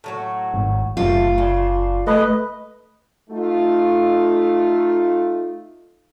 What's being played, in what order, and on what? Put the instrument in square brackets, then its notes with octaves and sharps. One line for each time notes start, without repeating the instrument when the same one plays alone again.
[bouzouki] A2 F#3 F#4
[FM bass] G#1
[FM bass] F#1 [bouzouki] A2 C3 A3 [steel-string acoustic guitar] F4
[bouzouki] C#3 D4
[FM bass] A3 [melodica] B4 D#5
[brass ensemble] A3 D#4 F4